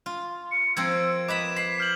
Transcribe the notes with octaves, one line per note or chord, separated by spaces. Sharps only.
F4
C#7
F3 A#3 C4 E6 G#6 D7
B4 D#5 A#5 B5 D6 E7
B5 B6 C7
F6 G6 F#7